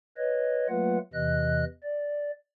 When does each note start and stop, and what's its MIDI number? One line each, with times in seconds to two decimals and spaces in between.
0.17 0.67 71
0.17 0.67 73
0.17 0.67 75
0.69 0.98 54
0.69 0.98 57
0.69 0.98 58
0.69 0.98 65
0.69 0.98 71
0.69 0.98 78
1.13 1.64 40
1.13 1.64 48
1.13 1.64 52
1.13 1.64 75
1.13 1.64 90
1.83 2.31 74